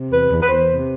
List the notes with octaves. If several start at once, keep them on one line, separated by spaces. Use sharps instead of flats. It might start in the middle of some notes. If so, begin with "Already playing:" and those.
Already playing: C3
E2 B4
E2
B4
E2 C5
C3